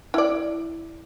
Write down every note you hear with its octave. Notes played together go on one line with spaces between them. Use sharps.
E4 D5